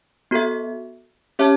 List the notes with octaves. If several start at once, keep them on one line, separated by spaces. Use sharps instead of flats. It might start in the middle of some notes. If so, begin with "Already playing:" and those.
B3 F#4 A4 E5
C#4 G4 C#5 E5 A5